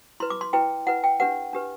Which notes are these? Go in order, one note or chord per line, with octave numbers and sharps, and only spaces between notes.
E4 B4 C6
D6
C6
E4 B4 G5
E4 B4 F#5
G5
D4 G4 B4 F#5
D4 G4 B4